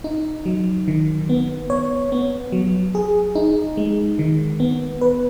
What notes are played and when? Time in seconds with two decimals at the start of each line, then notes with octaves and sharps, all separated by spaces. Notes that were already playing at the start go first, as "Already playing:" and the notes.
0.04 D#4
0.46 F#3
0.88 D#3
1.29 B3
1.70 C#5
2.12 B3
2.52 F#3
2.95 G#4
3.35 D#4
3.77 G#3
4.19 D#3
4.60 B3
5.01 B4